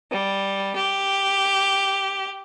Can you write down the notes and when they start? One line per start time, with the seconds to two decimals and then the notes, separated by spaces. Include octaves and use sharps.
0.10 G3
0.76 G4